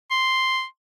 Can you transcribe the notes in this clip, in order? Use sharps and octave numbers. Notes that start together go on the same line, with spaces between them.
C6